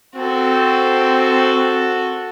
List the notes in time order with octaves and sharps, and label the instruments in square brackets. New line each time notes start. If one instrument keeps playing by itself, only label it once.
[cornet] C4 [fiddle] F#4 A4